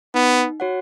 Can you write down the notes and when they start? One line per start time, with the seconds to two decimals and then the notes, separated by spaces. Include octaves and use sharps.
0.14 B3 D#4
0.60 F#4 C#5 F#5